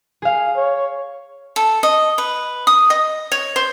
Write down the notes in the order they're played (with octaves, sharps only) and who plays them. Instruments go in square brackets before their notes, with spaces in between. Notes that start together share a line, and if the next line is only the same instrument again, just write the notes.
[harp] G#4 F5
[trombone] C#5
[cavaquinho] A4
D#5
B4
D#6
D#5
C#5
C5